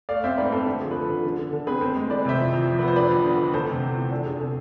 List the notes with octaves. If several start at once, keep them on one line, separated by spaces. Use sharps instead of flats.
A3 D5 F5
C4 C5 E5
G#2 B4 D5
C4 A4 C5
D3 A4
F3 G#4
B4
F3 A4
D3
D3
D3
D3 A4
C4 G#4 B4
C4 A4 C5
G#3
E3 B4 D5
C3 C5 E5
F2
F2
F3
B3 B4
C5
D4 B4 D5
F2
D3
A3
E2 A4 C5
C3
E2
E2
D4 A4
D4 G#4
C3 A4